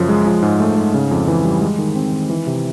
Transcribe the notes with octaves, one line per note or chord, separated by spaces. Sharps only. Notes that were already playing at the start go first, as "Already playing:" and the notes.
Already playing: F#2 C#3 F3
G#3
F3
G#2
A3
G#2
C#3
F2
E3
G3
G#3
D#3
C4
D#3
E3
C3